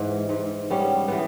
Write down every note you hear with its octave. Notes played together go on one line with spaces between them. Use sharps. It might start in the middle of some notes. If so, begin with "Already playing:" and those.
Already playing: G#2 E3
G#2
G3 B3 C#4
E3 B3